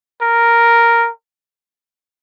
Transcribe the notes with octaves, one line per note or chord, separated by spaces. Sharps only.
A#4